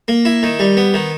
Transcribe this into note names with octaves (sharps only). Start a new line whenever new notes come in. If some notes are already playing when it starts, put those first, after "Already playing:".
A#3
E4
D#3
G3
B3
D#3